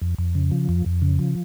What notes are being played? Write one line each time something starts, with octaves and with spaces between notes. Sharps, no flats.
F2
F2
C#3
F3
F2
F2
C#3
F3